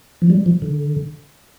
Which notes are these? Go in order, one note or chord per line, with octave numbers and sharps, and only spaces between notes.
F3
G3
F3
D3